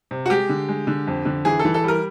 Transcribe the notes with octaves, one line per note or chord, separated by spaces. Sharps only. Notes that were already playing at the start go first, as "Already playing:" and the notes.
C3
F#4
G#3 G4
D3
G#3
D3
F2
D3
E3 G#4
A4
E3
A4
G3 A#4